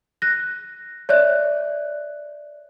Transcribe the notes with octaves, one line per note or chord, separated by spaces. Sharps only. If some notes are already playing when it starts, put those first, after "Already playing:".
F#6 A#6
C#5 D5 E5 F#6